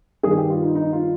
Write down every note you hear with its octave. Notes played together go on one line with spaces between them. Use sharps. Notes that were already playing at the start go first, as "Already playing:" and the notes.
G2 D#3 G#4
G4
F4
D#4
D#4
F4